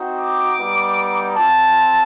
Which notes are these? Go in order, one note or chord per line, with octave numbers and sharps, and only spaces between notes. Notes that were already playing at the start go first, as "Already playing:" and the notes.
Already playing: C4 D#4 F#4
D6
G3 B3 D#4
C4 F4 A5